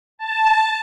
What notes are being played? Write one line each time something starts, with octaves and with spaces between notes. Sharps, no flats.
A5